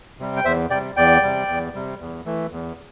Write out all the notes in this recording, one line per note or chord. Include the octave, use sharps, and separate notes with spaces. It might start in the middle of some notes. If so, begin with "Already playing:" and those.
C3 G3
G5
E2 C5 E5
C3 G3 D5 G5
E2 D5 G5
C3 G3
E2
C3 G3
E2
E3 A3
E2